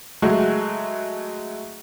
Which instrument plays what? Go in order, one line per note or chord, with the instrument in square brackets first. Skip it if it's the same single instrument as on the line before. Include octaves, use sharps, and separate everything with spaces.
[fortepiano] F#3 G#3 A3 F#4